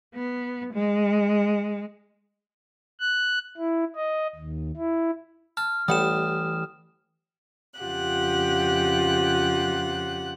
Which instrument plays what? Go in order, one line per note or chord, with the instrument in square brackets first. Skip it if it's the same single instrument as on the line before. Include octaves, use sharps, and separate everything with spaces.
[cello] B3
G#3
[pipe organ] F#6
E4
D#5
D#2
E4
[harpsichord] A5 [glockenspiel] F6
[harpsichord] A1 G3 [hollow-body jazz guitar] E3 F#5 [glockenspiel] D#6 E7
[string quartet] F2 C#3 F4 G4 F#5 F#6